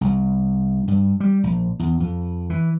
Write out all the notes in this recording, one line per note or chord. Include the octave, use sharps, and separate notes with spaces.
C2
G2
G3
A#1
E2
F2
E3